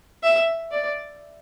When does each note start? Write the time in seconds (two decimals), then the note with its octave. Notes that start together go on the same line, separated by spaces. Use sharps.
0.23 E5
0.71 D5